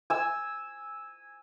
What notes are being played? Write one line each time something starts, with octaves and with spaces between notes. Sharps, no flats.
G#5 E6